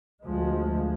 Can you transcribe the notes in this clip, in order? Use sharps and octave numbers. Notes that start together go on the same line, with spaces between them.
D2 F3 G#3